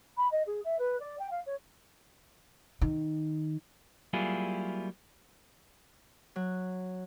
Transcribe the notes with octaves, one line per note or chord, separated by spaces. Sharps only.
B5
D#5
G#4
E5
B4
D5
G5
F5
C#5
D#3
F#3 G3 A#3 E4 F4 G#4
F#3